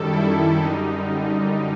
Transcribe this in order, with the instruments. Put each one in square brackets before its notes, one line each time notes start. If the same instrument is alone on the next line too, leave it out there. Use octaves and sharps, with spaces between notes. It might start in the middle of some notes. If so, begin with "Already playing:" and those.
Already playing: [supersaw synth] F#2 D#3 G3 A4
E4
F#2 D3 G3 D#4